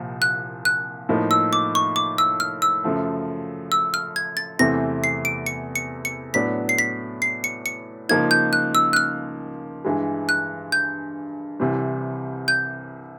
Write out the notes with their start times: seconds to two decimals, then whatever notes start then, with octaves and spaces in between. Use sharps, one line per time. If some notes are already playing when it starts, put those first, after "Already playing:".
Already playing: C2 A#2 F3
0.22 F#6
0.65 F#6
1.09 A2 F3 A#3 D#4
1.31 E6
1.53 D6
1.75 C#6
1.96 D6
2.18 E6
2.40 F6
2.62 E6
2.84 F#2 C#3 F3 A3
3.72 E6
3.94 F6
4.16 G#6
4.37 A6
4.59 E2 C3 E3 A3 C4 A#6
5.04 C7
5.25 D7
5.46 C#7
5.76 C#7
6.05 C#7
6.34 A2 F#3 B3 D4 B6
6.69 C7
6.79 B6
7.22 C7
7.44 C#7
7.66 C#7
8.09 C#2 C#3 F3 A#3 D#4 G#6
8.31 G6
8.53 F#6
8.75 E6
8.93 F#6
8.96 F6
9.85 G2 E3 G#3
10.29 F#6
10.72 G6
11.60 C2 C3 E3 G3
12.48 G6